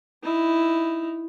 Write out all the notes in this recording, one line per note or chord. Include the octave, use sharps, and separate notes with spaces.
D#4 E4